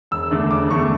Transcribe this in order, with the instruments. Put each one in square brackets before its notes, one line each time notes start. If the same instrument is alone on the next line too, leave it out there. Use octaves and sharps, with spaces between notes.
[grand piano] E1 E6
E2 D3 A3 D4
E1 D6
E2 D3 A3 D4 C#6